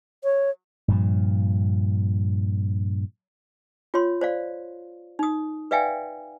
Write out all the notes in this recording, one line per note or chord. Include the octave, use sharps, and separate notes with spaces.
C#5
G2 A#2 F3
F4 C#5 C6
C5 D5 F5
D#4 D#6
B4 D5 E5 F5 G5 G#5